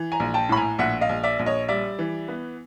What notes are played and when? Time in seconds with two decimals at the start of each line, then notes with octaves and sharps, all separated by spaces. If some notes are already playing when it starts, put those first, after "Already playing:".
Already playing: E3
0.12 G#5 A#5
0.20 A#1
0.34 G5 A5
0.49 A2 B5
0.56 G#5 A#5
0.79 A#1 E5 F#5
1.01 D#5 F5
1.09 A#1
1.23 D5 E5
1.39 A#1
1.46 C#5 D#5
1.69 G3 D5 E5
1.99 E3
2.28 B3